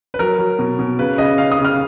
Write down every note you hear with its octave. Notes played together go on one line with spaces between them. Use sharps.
B4
F#3 A#4
F#3
B2
B2
C#3 B4
C#3 D#5
C#3 F5
D#6
C#3
F6